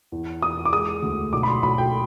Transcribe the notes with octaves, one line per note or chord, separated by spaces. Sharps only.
E2
E2 D#6
D6
G#3 D#6
D2
B1 D6
B5
C6
B1 B5
G5